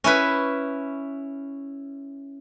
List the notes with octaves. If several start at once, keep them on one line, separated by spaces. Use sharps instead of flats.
C#4 E4 B4